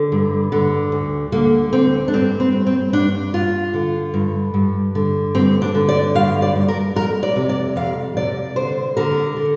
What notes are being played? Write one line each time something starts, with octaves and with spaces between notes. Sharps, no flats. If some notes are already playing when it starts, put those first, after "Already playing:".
Already playing: D3
G2
D3
D2
D3 A#3
D2 C4
D4
G2 C4
C4
G2
C4
G2 D4
G2 F4
D3
G2
G2
D3
G2 C4
D4
D3
D5
G2 F5
D5
G2
A#4
F2 A#4
D5
C3
D5
F2 F5
C3 D5
D3 C5
D3 A#4
D3